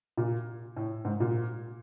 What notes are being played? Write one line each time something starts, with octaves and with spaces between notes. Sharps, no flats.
A#2
A2
G#2
A#2